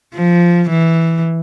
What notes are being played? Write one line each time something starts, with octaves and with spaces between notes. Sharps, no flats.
F3
E3